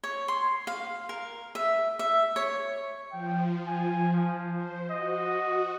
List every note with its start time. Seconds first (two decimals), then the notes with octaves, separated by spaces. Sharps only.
0.03 C#5
0.28 C6
0.67 F5
1.09 A#4
1.55 E5
1.99 E5
2.36 C#5
3.12 F3 G5
3.67 G#5
4.13 F3
4.55 C5
4.90 F#4 D#5